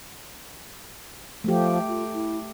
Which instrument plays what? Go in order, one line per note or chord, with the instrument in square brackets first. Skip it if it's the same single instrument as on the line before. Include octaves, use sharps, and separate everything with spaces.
[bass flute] F3 [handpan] A3 G4
[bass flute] F4
E4